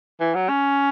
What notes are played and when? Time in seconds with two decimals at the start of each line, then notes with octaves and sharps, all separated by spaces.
0.20 E3
0.35 F#3
0.49 C#4